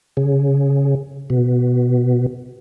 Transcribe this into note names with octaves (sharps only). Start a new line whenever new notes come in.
C#3
B2